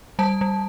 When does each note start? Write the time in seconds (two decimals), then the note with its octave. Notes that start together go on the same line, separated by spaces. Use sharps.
0.19 G3 A5
0.41 G3